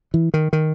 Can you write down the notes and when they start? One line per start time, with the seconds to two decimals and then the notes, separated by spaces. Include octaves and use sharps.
0.14 E3
0.34 D#3
0.53 D#3